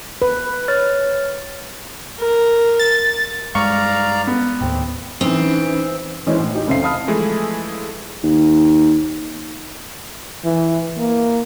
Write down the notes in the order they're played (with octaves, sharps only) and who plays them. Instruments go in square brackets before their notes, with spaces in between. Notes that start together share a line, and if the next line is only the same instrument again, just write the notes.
[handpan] B4
[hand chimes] C#5 F6 A6
[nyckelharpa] A#4
[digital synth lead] A6
[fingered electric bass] G2 G#3 [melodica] D5 F5 A#5 [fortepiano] C#6
[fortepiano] B3
[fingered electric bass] D#2 A2 [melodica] C4
[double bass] E3 [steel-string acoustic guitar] C4 [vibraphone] C#4 D#4
[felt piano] E3 G#3 C#4 D#4 E4 C5
A2
D#4 G4
F1 C#2 C#3 C5 E5 C7
D#5 F5 A5 B5 D#6 F6
[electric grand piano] E3 F3 G#3 A3 E4 G#4
[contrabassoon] D#2
[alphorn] E3
A#3